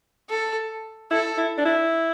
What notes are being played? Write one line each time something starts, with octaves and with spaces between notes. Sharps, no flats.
A4
E4 A4
E4
D4
E4